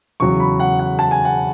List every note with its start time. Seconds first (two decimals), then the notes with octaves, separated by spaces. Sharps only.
0.20 E2 C#3 F#3 C#6
0.40 B5
0.60 F#5
0.79 F#5
0.99 A5
1.11 G#5
1.25 F#5